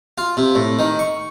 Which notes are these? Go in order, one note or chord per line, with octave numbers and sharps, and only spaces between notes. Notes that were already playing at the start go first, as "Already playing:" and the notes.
F4
C3
A2
D#3
C#6